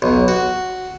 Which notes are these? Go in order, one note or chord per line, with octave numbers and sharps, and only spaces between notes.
B1
F#4